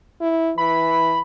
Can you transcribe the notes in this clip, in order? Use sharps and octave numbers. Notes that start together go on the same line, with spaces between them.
E4
E3 B5